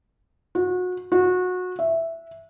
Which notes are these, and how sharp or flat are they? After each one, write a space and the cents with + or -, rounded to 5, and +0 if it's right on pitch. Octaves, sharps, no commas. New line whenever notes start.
F#4 -30
F#4 -25
E5 +0